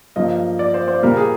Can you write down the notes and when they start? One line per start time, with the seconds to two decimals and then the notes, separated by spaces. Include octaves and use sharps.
0.16 G2 F3 A#3 D#5
0.59 D5
0.74 C5
0.88 C5
1.02 A#2 G3 A#3 A#4
1.17 G#4